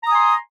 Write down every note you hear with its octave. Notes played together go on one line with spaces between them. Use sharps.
G#5 A#5 C6 D#6